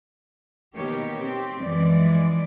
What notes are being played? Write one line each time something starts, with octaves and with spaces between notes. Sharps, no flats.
B2 D#3 A#3 G4 C#5
C4 G4
F#2 E3 F3 G#3 D5